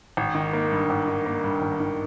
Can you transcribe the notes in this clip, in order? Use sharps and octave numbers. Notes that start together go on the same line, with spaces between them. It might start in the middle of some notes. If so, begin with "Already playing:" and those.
G#1
D#3
A#3
G2
G#1
D#3
A#3
G2
G#1
D#3